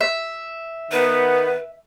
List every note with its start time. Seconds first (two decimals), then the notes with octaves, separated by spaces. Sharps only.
0.01 E5
0.92 D#3 B3 B4